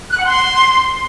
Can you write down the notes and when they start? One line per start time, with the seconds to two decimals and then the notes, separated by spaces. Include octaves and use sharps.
0.11 F#6
0.18 F#5
0.24 C6